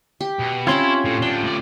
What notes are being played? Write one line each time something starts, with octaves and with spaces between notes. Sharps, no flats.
G4
B2
C4 C#4 E4 F4 G4 C#5 C6
A2
A2 D4 G5
A2 D5